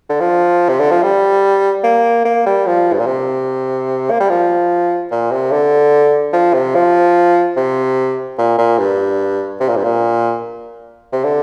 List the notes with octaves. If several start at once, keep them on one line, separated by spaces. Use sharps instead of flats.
D3
F3
C3
D3
F3
G3
A#3
A#3
G3
F3
G2
A#2
C3
A#3
G3
F3
A#2
C3
D3
F3
C3
F3
C3
A#2
A#2
G2
C3
A#2
G2
A#2
C3
D3